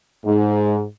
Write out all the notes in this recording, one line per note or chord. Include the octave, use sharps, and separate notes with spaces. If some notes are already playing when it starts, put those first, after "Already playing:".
G#2